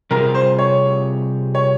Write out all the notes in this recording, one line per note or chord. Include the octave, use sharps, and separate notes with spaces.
C3 G3 C4 F4 G#4 A#4
C5
C#5
C#5